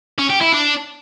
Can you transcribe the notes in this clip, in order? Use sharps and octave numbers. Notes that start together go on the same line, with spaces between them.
C#4
G4
E4
D4